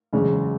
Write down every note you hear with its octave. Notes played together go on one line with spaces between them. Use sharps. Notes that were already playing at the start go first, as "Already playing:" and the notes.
F#1 E2 C#3 G#3 C#4